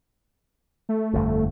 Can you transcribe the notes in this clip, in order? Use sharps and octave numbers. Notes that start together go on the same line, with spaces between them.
A3
G1 F2